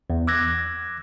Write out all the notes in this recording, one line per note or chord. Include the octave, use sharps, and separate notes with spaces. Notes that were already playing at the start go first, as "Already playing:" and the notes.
E2
D6 E6 F#6 G#6 A#6